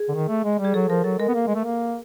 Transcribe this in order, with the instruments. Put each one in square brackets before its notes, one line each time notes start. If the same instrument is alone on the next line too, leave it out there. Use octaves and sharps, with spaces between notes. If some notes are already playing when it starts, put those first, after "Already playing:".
Already playing: [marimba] G#4
[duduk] D3
D#3
A3
G#3
G3
[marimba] G#4
[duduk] F#3 [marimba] A4
[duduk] F3 [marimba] A#4
[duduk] F#3 [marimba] A4
[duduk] G#3 [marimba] A#4
[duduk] B3
A#3
G#3
A3
A#3